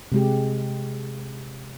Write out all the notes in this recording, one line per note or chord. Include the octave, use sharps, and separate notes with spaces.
C3 G#3 G4